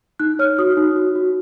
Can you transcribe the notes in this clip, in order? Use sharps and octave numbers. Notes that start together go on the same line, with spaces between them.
D#4 F#6
C#5 F6
F#4 D#6
D#4
F#4
F#4